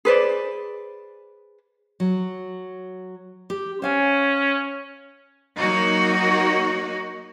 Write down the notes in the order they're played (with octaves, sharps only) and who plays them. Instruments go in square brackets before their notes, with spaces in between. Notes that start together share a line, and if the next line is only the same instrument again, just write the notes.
[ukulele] G#4 B4 C5 D5
[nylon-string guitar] F#3
G4
[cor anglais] C#4 [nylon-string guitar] C5 F5 G#5
[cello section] F#3 A#3 D#4 F#4